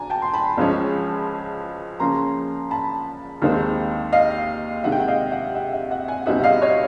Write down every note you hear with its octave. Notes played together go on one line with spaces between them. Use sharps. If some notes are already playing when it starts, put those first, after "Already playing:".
Already playing: D2 D4 G#5 A#5
G5 A5
C6
A5 B5
C#2 C#3 F3 G#3 C#4
C#3 F3 A#3 C#4 A#5 C6
A5 B5
D#2 D#3 G#3 C4 D#4
D#5 F5
C3 D#3 G#3 E5 F#5
G5
F#5
D#5 F5
E5 F#5
E5 F#5
E5 F#5
E5 F#5
F#5 G#5
C#2 B2 G3 C4 D#4 E5 F#5
D#5 F5
C#5 D#5